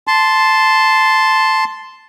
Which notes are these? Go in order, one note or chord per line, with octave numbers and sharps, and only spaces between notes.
A5 C6